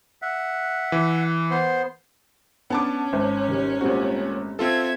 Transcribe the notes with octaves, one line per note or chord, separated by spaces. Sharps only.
E5 F#5
E3
B3 C5 C6
B3 C#4 D4 A5 D6
G#1 C5 A5
D#3 G3
A#2 G3 A3 C4 F#4
C4 F4 A4 E5 G#6